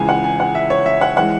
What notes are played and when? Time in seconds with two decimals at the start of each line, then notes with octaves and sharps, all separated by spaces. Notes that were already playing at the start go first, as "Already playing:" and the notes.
Already playing: C#2 C#3 E3 G#3 G#5
0.09 F#5
0.24 G#5
0.40 F#5
0.55 E5
0.70 C#5
0.86 E5
1.01 F#5
1.17 E3 G#3 F#5